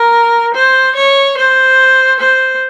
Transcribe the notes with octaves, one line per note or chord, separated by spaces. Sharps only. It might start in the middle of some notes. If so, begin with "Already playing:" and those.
Already playing: A#4
C5
C#5
C5
C5